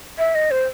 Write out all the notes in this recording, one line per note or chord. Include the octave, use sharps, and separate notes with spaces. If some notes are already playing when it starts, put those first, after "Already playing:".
E5
D#5
C5